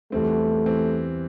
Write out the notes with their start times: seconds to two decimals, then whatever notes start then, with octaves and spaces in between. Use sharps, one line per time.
0.12 E2 E3 G3 A3 C4
0.66 E3 G3 C4